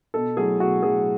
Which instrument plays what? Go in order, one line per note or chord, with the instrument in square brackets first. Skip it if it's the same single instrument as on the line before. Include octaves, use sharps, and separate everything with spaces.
[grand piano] B2 A4
F#3 A3 E4 G#4
B2 F#4
F#3 A3 E4 G#4